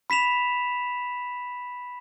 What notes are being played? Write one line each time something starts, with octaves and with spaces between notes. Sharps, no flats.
B5 B6 E7 F7